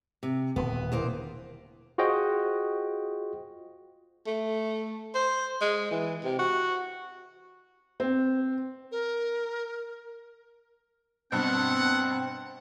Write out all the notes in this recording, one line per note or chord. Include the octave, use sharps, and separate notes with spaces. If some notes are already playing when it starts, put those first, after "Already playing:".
C3
D#1 B2 D3 B3
E2 A#3 C5
F4 F#4 G#4 C5 D#5 G5
A3
C5
G#3
E3
C3
F#4
C4
A#4
G2 B2 C4 F#5